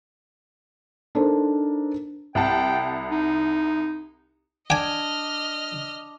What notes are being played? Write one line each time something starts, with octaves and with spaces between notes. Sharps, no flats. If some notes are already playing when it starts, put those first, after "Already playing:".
D4 D#4 A4 A#4 C5
C2 F#5 G5 A5
D#4
D4 D#5 G5 G#5 F6